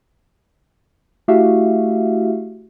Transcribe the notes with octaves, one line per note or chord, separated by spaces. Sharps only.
A3 E4 F#4 G4 E5 F5